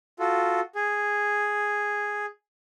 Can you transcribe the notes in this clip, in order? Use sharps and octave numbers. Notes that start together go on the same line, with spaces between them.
F4 F#4 A4
G#4